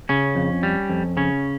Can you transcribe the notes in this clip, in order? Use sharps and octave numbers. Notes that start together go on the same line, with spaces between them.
C#3 C#4
F2
G3
F2
C#3 C#4